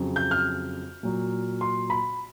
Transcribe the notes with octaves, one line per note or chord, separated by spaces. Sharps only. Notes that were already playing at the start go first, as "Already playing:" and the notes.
Already playing: F2 C#3 F#3
G6
F6
A#2 F#3
C6
B5